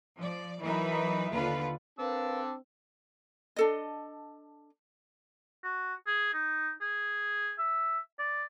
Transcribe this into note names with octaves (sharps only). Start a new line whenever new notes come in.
F3 D5
E3 F#3 D#4 A#4 B4 E5
D#2 D3 F4 B4
C4 D4 A#4 B4 F5 E6
D4 A4 D#5
F#4
G#4
D#4
G#4
E5
D5